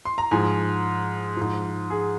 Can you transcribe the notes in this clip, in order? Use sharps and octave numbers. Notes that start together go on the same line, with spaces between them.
C6
A#5
G#2 F3 G#5
G#2 F3
G#4